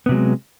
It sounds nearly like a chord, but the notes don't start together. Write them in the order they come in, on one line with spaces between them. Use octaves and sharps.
B3 C3 F#3 G#3